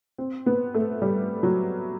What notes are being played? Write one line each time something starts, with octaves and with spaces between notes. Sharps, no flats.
C4
B3
A3
G3
F#3